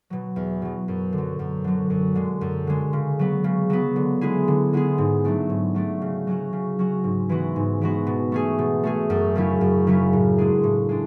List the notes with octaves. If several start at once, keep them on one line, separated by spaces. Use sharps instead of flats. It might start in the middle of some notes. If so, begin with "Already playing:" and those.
B2 F#3
E2
B2 F#3
F#2
D3
F#3
F#2
D3 F#3
F#2
D3 G#3
F#2
D3 G#3
C#3
F#3 B3
C#3
F#3 B3
D3
G#3 B3 E4 G#4
D3
G#3 B3 E4 G#4
G#2
F#3 A3 D4
G#2
F#3 A3 D4
C#3
F#3 C#4 F#4
C#3
F#3 C#4 F#4
G#2
E3 G#3 B3 F#4
G#2
E3 G#3 B3 F#4
B2
A3 C#4 G#4
B2
A3 C#4 G#4
F#2
C#3 F#3 C#4 E4
F#2
C#3 F#3 C#4 E4
A2
G#3 D4 G#4
A2
G#3 D4